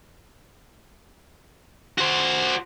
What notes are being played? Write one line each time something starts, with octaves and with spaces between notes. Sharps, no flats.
F#4 C5